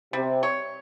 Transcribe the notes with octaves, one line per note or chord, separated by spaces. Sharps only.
C3 G3
C#5